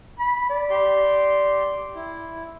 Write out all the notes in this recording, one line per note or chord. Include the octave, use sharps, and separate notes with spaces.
B5
D5
G4 C6
E4